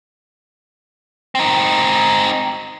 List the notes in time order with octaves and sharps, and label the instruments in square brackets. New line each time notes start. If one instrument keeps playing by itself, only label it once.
[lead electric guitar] C4 D#4